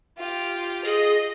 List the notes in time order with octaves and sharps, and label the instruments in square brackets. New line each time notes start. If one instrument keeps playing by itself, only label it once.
[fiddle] F4 G4
[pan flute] G#4 [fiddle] D#5